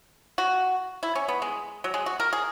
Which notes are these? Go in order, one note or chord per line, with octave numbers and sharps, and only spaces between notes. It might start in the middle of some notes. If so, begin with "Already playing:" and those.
F#4
E4
C#4
B3
G#3
F#3
G#3
F#4
A#4
G#4